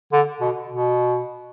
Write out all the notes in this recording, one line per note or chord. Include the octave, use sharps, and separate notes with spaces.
D3
B2
B2